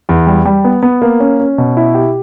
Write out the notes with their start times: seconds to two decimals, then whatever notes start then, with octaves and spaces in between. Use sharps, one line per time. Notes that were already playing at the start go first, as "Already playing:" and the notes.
0.09 E2
0.27 G3
0.45 G3
0.64 B3
0.83 B3
1.02 A#3
1.20 C#4
1.40 C#4
1.58 B2
1.77 E4
1.94 G4